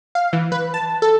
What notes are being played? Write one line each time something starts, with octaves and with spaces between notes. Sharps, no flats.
F5
E3
B4
A5
A4